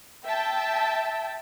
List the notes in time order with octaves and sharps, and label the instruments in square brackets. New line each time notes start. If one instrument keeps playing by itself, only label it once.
[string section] E5 G5 A5